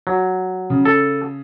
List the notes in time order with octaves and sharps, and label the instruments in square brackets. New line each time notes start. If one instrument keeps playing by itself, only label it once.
[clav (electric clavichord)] F#3
[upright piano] C#3
[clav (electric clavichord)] A4